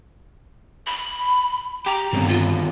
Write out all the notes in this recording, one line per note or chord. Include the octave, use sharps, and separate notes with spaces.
B5
G4 G5 A#5
G2 D3 D#3 B3 C4
F4